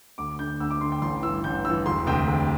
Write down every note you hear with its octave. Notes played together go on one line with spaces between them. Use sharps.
D2 D6
D3 G6
D2 E6
D6
D3 C6
G5
A1 C6
G2 E3 E6
A1 G6
G2 E3 E6
E1 C6
D2 C3 G5
E1